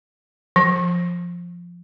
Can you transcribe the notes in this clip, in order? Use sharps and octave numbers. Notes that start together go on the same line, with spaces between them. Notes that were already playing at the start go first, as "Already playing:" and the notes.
F3